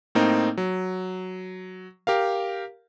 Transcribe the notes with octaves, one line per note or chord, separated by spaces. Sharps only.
A2 A#3 C4 D#4
F#3
G4 A#4 F5